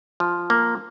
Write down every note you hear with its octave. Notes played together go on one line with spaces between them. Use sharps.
F3
A#3